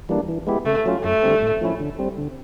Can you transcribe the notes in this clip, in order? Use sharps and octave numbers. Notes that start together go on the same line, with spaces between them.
E3 G3 A#3 D4
E3
G#3 B3 E4 G4
C#3 A3
F#3 A3 C#4 F4
F#2 A3
D3 G3 C4
A2
F3 A3 C#4 E4
D3
G3 C4
D3